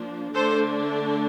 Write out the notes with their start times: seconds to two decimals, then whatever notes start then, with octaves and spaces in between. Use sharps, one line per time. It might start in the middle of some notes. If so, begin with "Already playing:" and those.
Already playing: F3 A#3 D4
0.33 D3 A3 D4 A4 C5